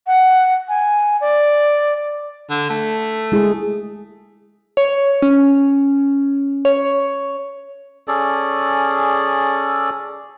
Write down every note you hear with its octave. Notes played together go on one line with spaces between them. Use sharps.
F#5
G#5
D5
D3
A3
G#3 E4 G#4
C#5
C#4
C#5
C#4 G#4 A4 D5